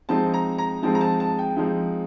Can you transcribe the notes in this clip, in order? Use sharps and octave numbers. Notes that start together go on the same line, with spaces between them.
F3 G#3 C4 D#4 A5
A#5
A#5
F3 G#3 C4 D#4 A5
A#5
A5
A5
G5
F3 G#3 C4 D#4